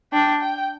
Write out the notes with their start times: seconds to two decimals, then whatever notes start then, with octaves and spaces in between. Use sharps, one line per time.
0.12 D4 G5
0.41 G5